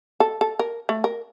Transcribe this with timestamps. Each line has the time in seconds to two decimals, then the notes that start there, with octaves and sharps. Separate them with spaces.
0.20 A4
0.41 A4
0.59 A#4
0.89 A3
1.04 A#4